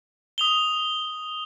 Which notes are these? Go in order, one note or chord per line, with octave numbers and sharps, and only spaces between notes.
D#6 F7 G7